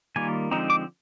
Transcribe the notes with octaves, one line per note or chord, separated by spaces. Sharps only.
D#3 G3 A#3 F4 G#5
D3 F3 G#3 C4 D#4 A#5
D6